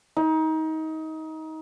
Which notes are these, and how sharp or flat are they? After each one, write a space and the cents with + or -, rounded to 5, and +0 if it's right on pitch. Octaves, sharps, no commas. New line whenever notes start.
D#4 +25